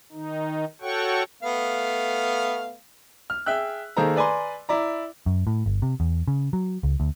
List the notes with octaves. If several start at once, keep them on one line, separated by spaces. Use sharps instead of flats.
D#3 D#4
F#4 A4 C#5 F#5 G5 C#6
A3 B3 F5
F6
G#4 E5 G5 E6 F#6
D#3 A#3 G#4 A4 C5 A#5
B4 D5 G#5 A#5 C6
E4 D5 A#5
F#2
A2
G1
C3
E2
C#3
F#3
C#2
D2